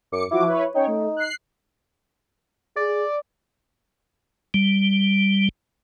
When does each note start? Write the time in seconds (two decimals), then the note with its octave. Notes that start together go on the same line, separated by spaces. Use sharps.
0.12 F#2 D6 C#7
0.31 F3 E4 F#4 D6
0.47 B4 C#5
0.75 C#4 D#4 C#5 G5
0.87 A3
1.16 F#6 C7
2.76 G#4 D5
4.54 G3